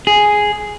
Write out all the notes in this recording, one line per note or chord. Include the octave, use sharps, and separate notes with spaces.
G#4